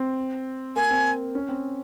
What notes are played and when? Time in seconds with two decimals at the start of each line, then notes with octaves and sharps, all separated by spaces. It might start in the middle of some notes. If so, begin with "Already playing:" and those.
Already playing: C4
0.76 A#3 G#5
0.91 C4
1.35 C#4
1.49 C4